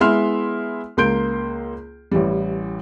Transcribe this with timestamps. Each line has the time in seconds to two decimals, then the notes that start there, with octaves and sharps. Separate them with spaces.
0.01 G#3 B3 E4 E5 C6 F6
0.97 C#2 A#3 C6 G6 D7
2.12 A1 E3 G3